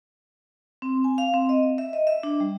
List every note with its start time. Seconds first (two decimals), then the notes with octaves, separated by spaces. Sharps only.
0.82 C4
1.04 G#5
1.18 F5
1.34 C4
1.49 D#5
1.78 E5
1.93 D#5
2.07 E5
2.23 D4
2.40 G3